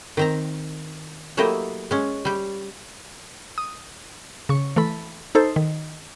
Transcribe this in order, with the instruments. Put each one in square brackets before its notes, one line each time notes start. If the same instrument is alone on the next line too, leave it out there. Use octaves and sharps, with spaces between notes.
[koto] D#3 C4 A#5
F#3 A3 A#3 E4 G4 D#5
G#3 C#4
G3 G4
[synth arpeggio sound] D#6
C#3 C#6
E3 A3 A4 B5
D#4 A4 C5
D#3